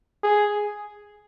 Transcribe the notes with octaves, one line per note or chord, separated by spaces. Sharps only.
G#4